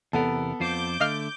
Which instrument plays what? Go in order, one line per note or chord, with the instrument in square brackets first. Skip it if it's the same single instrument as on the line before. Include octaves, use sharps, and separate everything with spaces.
[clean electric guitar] E2 C3 A#4 [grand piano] B3 A4
[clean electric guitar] F2 F4 C5 [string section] D6 G6
[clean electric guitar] D3 A3 [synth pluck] D#5 F5 F6